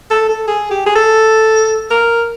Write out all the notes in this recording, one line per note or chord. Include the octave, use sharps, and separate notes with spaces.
A4
A4
G#4
G4
G#4
A4
A#4